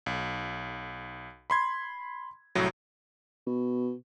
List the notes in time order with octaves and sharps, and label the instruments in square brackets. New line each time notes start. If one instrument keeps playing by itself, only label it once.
[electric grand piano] B1
B5 C6 G#6
C2 A2 F#3
[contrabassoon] B2